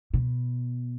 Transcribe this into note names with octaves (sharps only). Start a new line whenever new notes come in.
B2